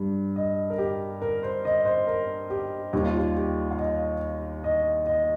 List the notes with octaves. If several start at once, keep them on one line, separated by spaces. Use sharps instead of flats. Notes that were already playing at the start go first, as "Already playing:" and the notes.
Already playing: G2 G3
D#5
A#4
G4
A#4
C5
D#5
C5
A#4
G4
D#2 D#3 G3 G4
F4
G4
G4
F5
D#5
D#5
D#5